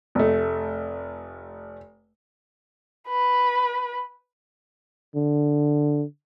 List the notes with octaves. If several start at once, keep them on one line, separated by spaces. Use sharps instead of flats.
F1 A3
B4
D3